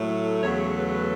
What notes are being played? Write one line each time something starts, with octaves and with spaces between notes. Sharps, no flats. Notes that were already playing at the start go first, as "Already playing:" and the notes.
Already playing: A2 F#3 A3
E2 C#3 F#3 A3 C#5
C#5
B4
B4